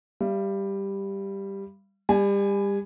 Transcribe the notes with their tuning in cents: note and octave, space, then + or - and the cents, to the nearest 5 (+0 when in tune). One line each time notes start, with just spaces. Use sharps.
G3 +5 F5 -45
G3 +30 G#5 +0